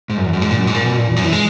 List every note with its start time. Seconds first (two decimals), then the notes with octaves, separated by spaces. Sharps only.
0.10 G#2
0.17 F#2
0.26 E2
0.33 F#2
0.42 G#2
0.51 A#2
0.58 F#2
0.67 G#2
0.74 A#2
0.85 B2
0.97 A#2
1.08 E2
1.16 F#2
1.24 E3
1.33 G#3